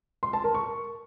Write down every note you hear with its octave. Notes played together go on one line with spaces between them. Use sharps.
C6
A5
A#4
C#6